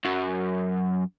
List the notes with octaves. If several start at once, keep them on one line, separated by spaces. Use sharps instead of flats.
F#2